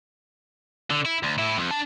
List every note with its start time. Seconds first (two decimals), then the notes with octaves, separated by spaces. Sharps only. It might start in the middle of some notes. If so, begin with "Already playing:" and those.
0.90 D3
1.05 E4
1.23 D2
1.38 A2 E4
1.57 F2
1.71 D4 A5